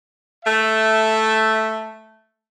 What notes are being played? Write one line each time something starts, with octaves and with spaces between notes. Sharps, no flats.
A3 E5